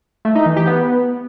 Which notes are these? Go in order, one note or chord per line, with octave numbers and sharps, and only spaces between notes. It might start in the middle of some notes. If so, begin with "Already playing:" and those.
A3
D#4
E3
G4
B3